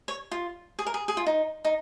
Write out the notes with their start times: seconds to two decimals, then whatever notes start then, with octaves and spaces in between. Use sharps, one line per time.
0.08 C#5
0.31 F4
0.79 G#4
0.86 A#4
0.94 G#4
1.08 G#4
1.17 F4
1.26 D#4
1.65 D#4